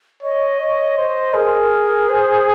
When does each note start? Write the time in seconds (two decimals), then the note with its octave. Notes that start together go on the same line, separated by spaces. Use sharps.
0.23 C#5 D#5
0.60 C#5
0.97 C5
1.34 G#4 A#4
2.09 C5